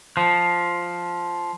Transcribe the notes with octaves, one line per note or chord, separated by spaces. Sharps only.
F3